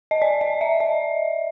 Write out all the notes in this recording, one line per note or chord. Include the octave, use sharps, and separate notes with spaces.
D#5
D5
D#5
E5
D#5